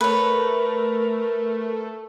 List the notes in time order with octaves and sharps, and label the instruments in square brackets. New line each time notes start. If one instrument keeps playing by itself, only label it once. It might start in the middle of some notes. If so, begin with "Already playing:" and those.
[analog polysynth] A3 [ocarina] A#4 [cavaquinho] B4 C#5